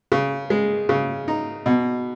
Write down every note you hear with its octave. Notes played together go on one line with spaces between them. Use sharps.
C#3
G#3
C#3
D#4
B2